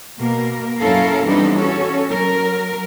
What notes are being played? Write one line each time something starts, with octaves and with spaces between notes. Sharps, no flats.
B2 A#3 A#4
F#2 C#4 E4 A4 A#4 F5
E3 G3 B3 C4 D4 D#4
C#4 F#4 A4 C#5
F#3 A#4